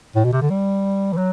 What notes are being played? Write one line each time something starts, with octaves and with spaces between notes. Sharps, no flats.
A2
B2
C3
D3
G3
E3
F#3